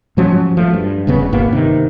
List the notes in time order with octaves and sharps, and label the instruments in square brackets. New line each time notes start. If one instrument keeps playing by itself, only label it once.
[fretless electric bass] G#2 F3 F#3 C#4
F3 A3
G2
F1 D2 C#3 B3
G1 G2 A#3 B3
C3 D#3